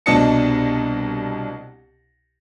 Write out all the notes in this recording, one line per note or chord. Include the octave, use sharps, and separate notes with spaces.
C2 B2 D4 D#5 A5 C#7